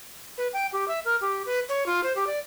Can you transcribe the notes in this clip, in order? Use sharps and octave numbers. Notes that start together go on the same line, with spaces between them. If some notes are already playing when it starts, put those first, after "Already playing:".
B4
G5
G4
E5
A#4
G4
B4
C#5
F4
C5
G4
D5